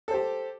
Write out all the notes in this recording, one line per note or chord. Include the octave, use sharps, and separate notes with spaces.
G4 A4 C5